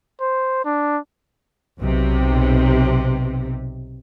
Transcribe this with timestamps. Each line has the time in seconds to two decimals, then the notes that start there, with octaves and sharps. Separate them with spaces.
0.20 C5
0.65 D4
1.81 B1 C3